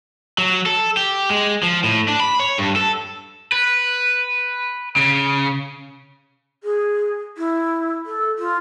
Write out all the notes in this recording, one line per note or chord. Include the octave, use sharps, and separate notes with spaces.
F#3
A4
G4
G#3
F3
A2
D4
B5
C#5
G2
A4
B4
C#3
G#4
E4
A4
F4